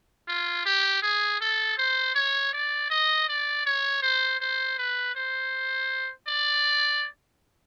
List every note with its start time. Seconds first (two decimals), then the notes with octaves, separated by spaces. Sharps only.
0.28 F4
0.66 G4
1.02 G#4
1.41 A4
1.78 C5
2.15 C#5
2.53 D5
2.90 D#5
3.29 D5
3.66 C#5
4.03 C5
4.41 C5
4.78 B4
5.15 C5
6.28 D5